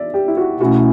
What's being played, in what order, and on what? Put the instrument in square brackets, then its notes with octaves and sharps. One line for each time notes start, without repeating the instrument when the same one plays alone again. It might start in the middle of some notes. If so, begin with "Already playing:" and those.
Already playing: [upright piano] D5 E5
G4
E4
F#4
[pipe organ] B2 A3 C#4 E4 [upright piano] F#4